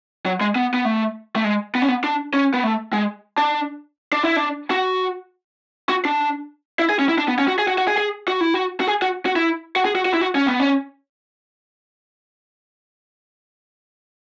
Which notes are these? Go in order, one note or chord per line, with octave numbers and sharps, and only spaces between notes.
F#3
G#3
B3
B3
A3
A3
G#3
B3
C#4
B3
D4
C#4
B3
A3
G#3
D4
D4
E4
D4
F#4
F#4
D4
E4
G#4
C#4
E4
D4
B3
C#4
F#4
G#4
F#4
F#4
G#4
G#4
F#4
E4
F#4
F#4
G#4
F#4
F#4
E4
F#4
G#4
F#4
F#4
E4
F#4
C#4
B3
C#4